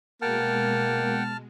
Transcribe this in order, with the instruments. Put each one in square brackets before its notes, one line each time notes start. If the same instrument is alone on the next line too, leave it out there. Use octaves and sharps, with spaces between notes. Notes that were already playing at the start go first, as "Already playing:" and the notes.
[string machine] B2 G#3 [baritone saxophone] A#3 [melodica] F#5 G5 [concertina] A5 F6